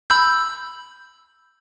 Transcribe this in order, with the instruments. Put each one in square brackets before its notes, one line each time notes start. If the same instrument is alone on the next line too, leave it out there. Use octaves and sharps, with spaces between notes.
[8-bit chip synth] B5 E6 G6